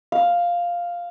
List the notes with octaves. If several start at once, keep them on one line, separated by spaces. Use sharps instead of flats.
F5